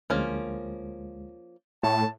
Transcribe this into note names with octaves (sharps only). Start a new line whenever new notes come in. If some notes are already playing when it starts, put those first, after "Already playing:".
D2 F3 G#3 A#3 C#4
A2 C#5 A5